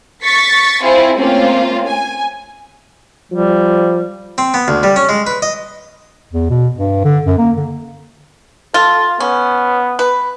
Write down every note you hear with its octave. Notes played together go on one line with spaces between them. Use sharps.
C#6 A6 B6 C#7
C4 E4 F4 G#4
A3 A#3 C4 C#4 F4
G#5
F3 G3
C4
B3
D2
G3
C#4
G#3
B4
D#5
E2
B2
G2
D3
F#2
A#3
D3
F4 A4
B3 C#4
B4